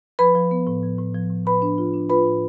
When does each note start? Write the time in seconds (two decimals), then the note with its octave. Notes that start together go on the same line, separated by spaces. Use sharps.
0.19 F3 B4 B5
0.35 F3
0.51 B3
0.67 A2
0.83 F3
0.98 A2
1.14 F3
1.30 A2
1.46 A2 B4 B5
1.62 D4
1.78 F4
1.94 D4
2.09 F4 B4 B5
2.25 A2